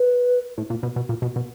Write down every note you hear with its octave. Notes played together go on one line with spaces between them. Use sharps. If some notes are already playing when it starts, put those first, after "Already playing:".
Already playing: B4
A2
A#2
B2
B2
A#2
B2
B2